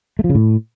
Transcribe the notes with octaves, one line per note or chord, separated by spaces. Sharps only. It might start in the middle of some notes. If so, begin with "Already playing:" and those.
A3
F3
C#3
A2